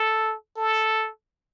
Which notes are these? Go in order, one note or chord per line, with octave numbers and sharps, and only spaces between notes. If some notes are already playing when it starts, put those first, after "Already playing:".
Already playing: A4
A4